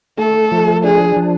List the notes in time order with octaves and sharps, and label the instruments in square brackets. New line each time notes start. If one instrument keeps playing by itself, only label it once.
[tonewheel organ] A3 [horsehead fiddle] A4
[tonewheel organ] F3
[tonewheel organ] D4 [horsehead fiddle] G#4
[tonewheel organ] F3